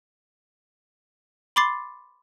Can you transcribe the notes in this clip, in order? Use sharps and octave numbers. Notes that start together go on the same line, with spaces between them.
B5 C6 D6 A6 C7